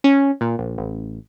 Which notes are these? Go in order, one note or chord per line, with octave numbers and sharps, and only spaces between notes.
C#4
A#2
A#1
A1